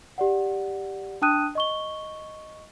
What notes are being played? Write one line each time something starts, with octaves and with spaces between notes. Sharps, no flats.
G4 D5 F#5
D4 G5 A5 D#6 F#6 D#7
D#5 C#6 G7